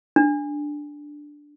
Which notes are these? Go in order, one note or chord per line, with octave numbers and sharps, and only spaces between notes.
D4